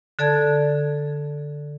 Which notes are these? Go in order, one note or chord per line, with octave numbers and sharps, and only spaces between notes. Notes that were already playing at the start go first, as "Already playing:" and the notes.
D3 A4 D5 A5 G#6